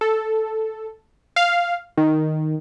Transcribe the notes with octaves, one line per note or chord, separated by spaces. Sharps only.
A4
F5
D#3